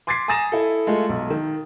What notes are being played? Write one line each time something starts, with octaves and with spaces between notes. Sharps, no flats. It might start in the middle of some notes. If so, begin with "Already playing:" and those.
C6 D6 G#6 A6 B6 C7
G#5 A#5 D#6 A6 A#6 E7
E4 A4
G#3 A3 F4 A4
B1
D#3